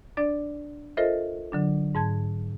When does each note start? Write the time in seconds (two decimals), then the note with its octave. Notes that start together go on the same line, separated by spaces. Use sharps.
0.17 D4 D5 A6
0.97 F4 A4 A#4 C5 D#5 E5
1.52 D3 F#3 D4
1.95 G#2 A5 G#6